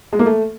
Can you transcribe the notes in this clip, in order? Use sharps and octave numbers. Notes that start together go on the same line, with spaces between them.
G#3
A#3
A3